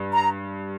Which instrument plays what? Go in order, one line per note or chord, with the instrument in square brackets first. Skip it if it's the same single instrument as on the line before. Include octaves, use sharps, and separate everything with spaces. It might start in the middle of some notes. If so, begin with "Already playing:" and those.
Already playing: [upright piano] G2
[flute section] A#5